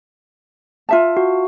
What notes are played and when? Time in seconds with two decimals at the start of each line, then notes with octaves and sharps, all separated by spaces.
0.89 F4 E5 A5
1.17 F#4